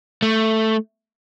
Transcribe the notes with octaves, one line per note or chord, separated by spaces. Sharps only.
A3